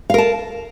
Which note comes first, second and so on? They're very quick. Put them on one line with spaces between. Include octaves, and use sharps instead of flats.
F5 A#4 A5